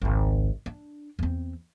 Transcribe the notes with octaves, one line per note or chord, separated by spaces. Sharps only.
G#1 C#2
D4
E2 C4